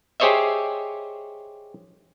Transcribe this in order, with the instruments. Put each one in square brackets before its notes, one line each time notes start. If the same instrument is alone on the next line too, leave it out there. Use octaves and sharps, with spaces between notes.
[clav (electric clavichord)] G4 G#4 C5 C#5 D#5 E5